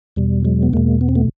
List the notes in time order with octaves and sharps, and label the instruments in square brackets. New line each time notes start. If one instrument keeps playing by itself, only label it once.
[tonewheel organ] E2 B2 G3
F#3 G#3
B3
E2 B2 G#3 A#3
B3
C4
A3 B3